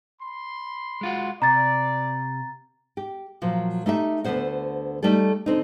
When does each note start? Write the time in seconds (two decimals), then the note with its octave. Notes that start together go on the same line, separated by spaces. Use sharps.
0.21 B5 C6
1.01 G#3 F4 F#4
1.42 C3 D5 A#5 A6
2.97 G4
3.42 A#2 F3 F#3
3.86 A3 D#4 G4 E5
4.24 D2 D3 D#3 B3 C5 F#5
5.03 G3 A3 D#4 G4 A4
5.46 D3 C4 D#4